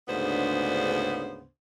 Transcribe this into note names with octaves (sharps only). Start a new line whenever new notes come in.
D2 G#2 C#3 B3 D4 C5